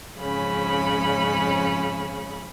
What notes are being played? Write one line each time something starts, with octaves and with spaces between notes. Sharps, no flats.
F2 G#2 C#3 C#4 B5